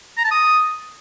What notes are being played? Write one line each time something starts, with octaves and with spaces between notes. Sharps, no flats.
A#5
A5
D#6